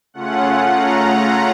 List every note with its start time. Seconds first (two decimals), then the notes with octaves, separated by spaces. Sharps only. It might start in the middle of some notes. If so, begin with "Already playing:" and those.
0.14 C#3 A3 C#4 F4 F#5
0.71 A#5